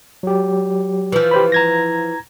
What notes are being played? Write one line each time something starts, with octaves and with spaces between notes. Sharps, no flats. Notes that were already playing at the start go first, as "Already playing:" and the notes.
F#3 G4
E3 F3
G4 C5 B5
A#5 G#6 A#6